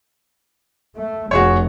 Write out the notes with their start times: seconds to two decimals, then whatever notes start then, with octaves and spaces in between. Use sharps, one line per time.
0.97 A3
1.31 F1 F#4 G#4 C#5